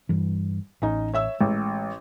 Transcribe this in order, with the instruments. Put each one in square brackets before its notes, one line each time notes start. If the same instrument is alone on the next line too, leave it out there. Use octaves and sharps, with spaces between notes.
[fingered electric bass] G2 E3
[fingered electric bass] A1 [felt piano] C#4 D#4
[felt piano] C#5 E5 E6
[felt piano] A1 [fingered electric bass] G#3